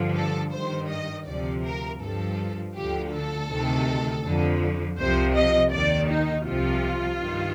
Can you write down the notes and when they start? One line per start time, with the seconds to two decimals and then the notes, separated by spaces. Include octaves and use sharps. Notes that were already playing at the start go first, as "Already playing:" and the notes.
Already playing: G2 D3 F3
0.15 A4
0.52 G2 D#3 C5
0.90 D#5
1.26 D2 C3 F3 D5
1.64 A#4
2.01 G2 F3 A4
2.75 D2 D3 F3 G4
3.12 A4
3.49 D2 C3 D#3
4.24 F2 D3 F3
4.98 C2 C3 F3 C5
5.35 D#5
5.72 D#2 D#3 D5
6.09 D#4
6.46 C2 C3 F3 F4
7.21 G2 D#3